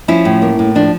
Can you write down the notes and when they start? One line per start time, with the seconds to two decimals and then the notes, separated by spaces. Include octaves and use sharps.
0.08 F3 C#4 E4
0.25 A2
0.42 A#3
0.59 A2
0.75 F3 D4